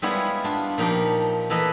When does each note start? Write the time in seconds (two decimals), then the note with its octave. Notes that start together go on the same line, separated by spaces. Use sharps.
0.02 G3 G#3 B3 E4 F4 C#5
0.44 D4 F4
0.78 A#2 F3 D#4 G4
1.50 E3 A#3 A4 B4 D#5